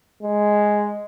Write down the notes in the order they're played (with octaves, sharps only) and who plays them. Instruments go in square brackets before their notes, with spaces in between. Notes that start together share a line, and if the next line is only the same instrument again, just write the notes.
[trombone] G#3